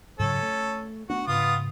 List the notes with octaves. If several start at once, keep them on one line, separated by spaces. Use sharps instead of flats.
G#2 C#3 F#3 C#4 A4
A3
A3 B3 D4 F#4
G#2 C#3 B3 F4 D#6